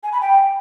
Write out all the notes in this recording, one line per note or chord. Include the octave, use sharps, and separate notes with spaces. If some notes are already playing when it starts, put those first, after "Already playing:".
G#5
B5
G5